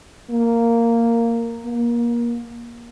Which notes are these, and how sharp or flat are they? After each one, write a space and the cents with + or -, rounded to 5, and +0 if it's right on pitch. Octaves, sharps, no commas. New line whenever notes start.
A#3 -10
A#3 +25